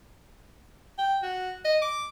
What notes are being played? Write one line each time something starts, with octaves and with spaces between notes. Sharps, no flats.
G5
F#4
D#5
D6